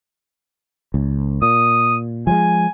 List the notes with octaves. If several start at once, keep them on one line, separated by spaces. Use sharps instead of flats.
C#2
A#2 D#6
F3 F#3 G#3 G#5